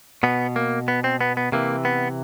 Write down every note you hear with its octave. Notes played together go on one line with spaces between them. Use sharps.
B2 B3
A#3
B3
C4
B3
B3
C3 E3 A#3
B3